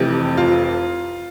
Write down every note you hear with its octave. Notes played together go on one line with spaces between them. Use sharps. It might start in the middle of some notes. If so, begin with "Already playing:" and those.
Already playing: F1 F2 E3 G4
F4